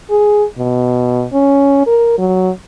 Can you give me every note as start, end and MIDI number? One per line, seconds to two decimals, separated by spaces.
0.10 0.44 68
0.58 1.26 47
1.33 1.84 61
1.86 2.15 70
2.18 2.50 54